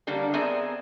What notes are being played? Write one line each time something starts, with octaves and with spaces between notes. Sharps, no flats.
D3 G3 A#3 D4
B3 C4 G#4 A#4 E5